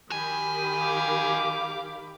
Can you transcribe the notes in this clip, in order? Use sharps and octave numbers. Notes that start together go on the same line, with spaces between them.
D#3 F#4 G4 G#5 B5
F5 D6